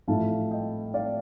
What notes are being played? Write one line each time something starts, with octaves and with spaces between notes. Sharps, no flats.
A1 A2 F3 A3 F5 A5
D#5 G5
D5 F5